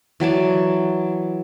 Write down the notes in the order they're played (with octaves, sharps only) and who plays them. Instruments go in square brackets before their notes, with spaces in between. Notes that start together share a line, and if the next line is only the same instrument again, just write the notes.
[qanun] E3 F#3 D5 A5